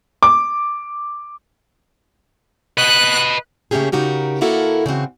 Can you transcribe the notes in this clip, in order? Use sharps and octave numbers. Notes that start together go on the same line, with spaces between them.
D6
B4 D#5 F#6
C#3 A3 A#3 C#4 G4 G#4
C#3 D#4 F#4 G4 A#4
D3 A#3 E4 F#4 A4 A#4
C#3 E3 C4 F#4